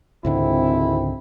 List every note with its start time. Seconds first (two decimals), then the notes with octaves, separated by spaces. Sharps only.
0.25 G#1 C#2 G#2 D3 C4 E4